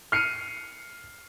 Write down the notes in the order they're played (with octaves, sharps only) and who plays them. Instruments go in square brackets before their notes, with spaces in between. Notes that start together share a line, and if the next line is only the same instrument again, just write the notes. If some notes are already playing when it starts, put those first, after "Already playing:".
[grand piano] F6 C7 C#7 D#7